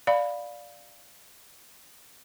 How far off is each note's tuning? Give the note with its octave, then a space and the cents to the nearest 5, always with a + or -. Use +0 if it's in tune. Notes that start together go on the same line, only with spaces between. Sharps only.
D5 +0 F5 +15 B5 +0